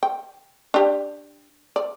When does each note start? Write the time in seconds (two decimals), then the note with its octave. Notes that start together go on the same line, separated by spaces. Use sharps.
0.03 G5
0.74 D4 G4
1.76 D5